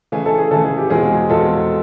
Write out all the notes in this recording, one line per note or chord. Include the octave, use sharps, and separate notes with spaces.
C#3 E3 A3 G#4
A4
G#4
C#3 E3 A3 A4
G#4
G4
E2 B2 G#3 C4 F4 G#4
E2 B2 G#3 C4 F4 A4